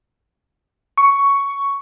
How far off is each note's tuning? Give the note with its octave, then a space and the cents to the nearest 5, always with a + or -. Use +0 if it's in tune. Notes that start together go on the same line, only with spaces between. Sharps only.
C#6 +10